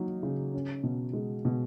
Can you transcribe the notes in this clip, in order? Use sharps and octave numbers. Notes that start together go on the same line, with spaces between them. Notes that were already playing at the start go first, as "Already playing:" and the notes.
Already playing: F#3 A#3 D#4
C#3
C#4
B2
G#3
B2